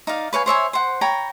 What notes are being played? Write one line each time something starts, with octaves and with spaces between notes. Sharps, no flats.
D#4 D5 F5
B4 C#5 F5 G#5
C5 C#5 E5 G#5
C5 F#5
C#5 G5 A#5 B5